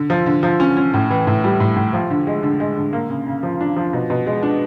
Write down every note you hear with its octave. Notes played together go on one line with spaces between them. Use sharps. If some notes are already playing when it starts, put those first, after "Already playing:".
Already playing: D3
F3
D3
F3
C#4
C#4
A2
E3
A2
G3
A2
A2
F3
D3
G#3
D3
G#3
D3
A#3
C#3
C#3
F3
D4
F3
B2
B2
G#3
D4